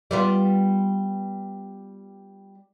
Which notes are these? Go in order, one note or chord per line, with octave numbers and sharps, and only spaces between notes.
G3 B3 F4